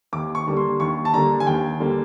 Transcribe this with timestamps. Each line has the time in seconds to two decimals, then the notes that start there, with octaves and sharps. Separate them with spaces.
0.13 D#2 D6
0.35 C#6
0.47 D3 G3 A#3
0.57 C6
0.80 D#2 C#6
1.05 A5
1.14 D3 G3 A#3 A#5
1.40 G#5
1.47 D#2 G5
1.80 D3 G3 A#3